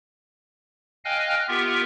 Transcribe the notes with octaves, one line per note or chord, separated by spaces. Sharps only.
D#5 F5 G5 G#5 F6 F#6
B3 F4 G4 A#4 E5